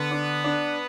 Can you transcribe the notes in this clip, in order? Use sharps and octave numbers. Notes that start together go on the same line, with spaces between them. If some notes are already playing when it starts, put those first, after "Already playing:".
Already playing: D3 B3
D4
D4